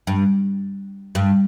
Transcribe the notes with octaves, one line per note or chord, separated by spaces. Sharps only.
G2
G2